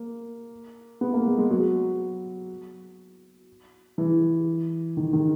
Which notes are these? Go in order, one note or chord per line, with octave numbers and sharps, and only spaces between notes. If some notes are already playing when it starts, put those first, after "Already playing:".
Already playing: A#3
B3
A#3
G#3
G#3
F#3
E3
D#3
D#3